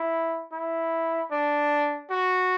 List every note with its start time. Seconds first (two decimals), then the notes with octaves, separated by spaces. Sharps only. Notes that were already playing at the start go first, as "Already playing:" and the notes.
Already playing: E4
0.52 E4
1.31 D4
2.10 F#4